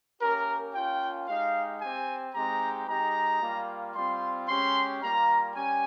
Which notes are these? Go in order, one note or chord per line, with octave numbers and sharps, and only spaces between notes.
A#3 C#4 G4 A#4
A#3 C#4 F4 G5
G#3 D#4 G4 F5
C4 G4 G#5
G#3 C4 D#4 G4 A#5
G#3 D#4 G4 A#5
G3 A#3 F4
G3 C4 F4 C6
G#3 C#4 G4 C6
G3 A#3 F4 A#5
G3 C#4 G4 G#5